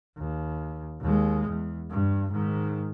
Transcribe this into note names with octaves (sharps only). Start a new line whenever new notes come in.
D#2
D#2 G#3
E2
G2
G#2 D#3